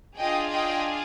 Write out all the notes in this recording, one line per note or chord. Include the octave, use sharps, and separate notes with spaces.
D4 F4 G#4 D#5 G5
D#5 G5